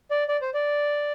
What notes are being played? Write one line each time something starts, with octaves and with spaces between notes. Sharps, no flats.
D5
D5
C5
D5